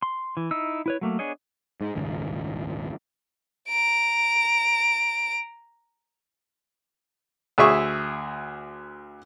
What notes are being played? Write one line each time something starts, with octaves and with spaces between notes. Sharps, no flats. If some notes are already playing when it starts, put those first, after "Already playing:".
C6
E3
D#4 E4 E6
E4 B4 C#5
F#3 A3 A#3
B3 D4 G#4 C#5 D#5
G#2
D#1 G#1 C#2
A#5 D7
D2 G#4 E5 C#6